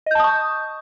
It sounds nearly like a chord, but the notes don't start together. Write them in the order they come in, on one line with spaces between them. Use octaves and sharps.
D#5 G6 A5 D#6 C#6